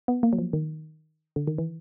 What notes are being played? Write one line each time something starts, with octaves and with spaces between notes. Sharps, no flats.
B3
A#3
F#3
F3
D#3
D3
D#3
E3